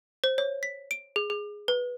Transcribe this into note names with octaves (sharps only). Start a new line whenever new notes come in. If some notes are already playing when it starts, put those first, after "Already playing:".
C5
C#5
B6
D7
G#4
G#4
B4